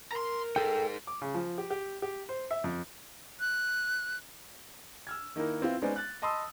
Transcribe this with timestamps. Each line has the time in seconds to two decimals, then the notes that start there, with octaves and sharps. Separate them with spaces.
0.12 A#4 A#5 C6
0.56 D#4 G#4 A4 G5
1.07 D6
1.22 C#3
1.35 F3
1.58 G4
1.70 G4
2.02 G4
2.29 C5
2.51 E5
2.64 F2
3.40 F#6
5.07 E6 F6 G#6
5.36 D#3 A#3 D#4 E4 A#4
5.61 B3 C4 E4 F4
5.82 G#3 B3 C#4 D#4 C5 D5
5.96 F#6 A6
6.22 D#5 A5 B5 C6 D#6 E6